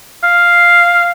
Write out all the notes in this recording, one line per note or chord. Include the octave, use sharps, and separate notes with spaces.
F5